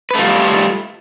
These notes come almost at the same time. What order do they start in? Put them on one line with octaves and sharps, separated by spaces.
B4 A3 F4 G3